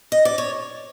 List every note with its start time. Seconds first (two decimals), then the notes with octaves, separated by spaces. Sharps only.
0.12 D#5
0.25 D5
0.38 C#5